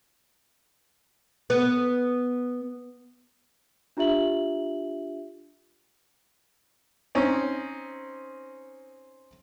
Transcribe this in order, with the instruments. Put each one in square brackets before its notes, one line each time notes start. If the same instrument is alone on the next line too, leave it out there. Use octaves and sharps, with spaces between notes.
[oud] B3
[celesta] D4 F4 G4 E5 F#7
[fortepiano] C4 C#4 D#4